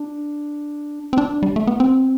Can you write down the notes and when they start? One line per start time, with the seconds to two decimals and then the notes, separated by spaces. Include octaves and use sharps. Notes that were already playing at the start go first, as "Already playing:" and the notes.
Already playing: D4
1.13 C4
1.18 D4
1.43 G3
1.56 A3
1.67 B3
1.80 C4